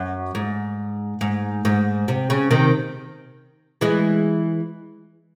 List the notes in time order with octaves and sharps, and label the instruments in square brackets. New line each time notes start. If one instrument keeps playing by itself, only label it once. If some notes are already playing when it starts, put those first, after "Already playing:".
Already playing: [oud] F#2
G#2
G#2
G#2
C3
C#3
C3 D#3
E3 G#3